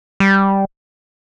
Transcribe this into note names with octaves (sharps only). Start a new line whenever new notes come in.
G3